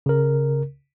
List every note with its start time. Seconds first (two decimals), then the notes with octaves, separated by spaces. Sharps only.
0.06 C#3 A#4